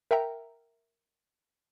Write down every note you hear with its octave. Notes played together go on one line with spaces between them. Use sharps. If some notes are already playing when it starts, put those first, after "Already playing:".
A#4 E5 F#5 G5 A#5